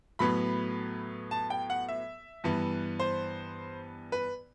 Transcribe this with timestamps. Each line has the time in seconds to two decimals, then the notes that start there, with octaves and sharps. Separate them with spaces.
0.19 A2 F#3 B3 B5
1.31 A5
1.50 G5
1.70 F#5
1.88 E5
2.44 G2 E3 B3
3.00 C5
4.12 B4